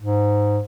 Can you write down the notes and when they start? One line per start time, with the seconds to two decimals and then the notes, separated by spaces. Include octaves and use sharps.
0.01 G#2